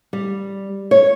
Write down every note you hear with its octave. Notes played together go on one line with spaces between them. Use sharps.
G3
C#5